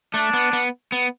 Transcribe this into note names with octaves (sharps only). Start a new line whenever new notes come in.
A3 D4
B3
B3
B3